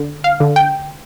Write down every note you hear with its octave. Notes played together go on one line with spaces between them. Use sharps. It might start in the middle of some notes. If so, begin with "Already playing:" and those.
Already playing: D3
F5
D3
G5